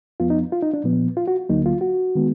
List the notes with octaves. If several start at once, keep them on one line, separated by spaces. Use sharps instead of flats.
F2 F3 B3 F4
D#4
F4
D#4
D4
A#2 F3 B3
F4
F#4
D2 D3 F#3 A#3 D#4
F4
F#4
D#3 G#3 B3